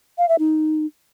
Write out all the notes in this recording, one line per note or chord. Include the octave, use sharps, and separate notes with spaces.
F5
E5
D#4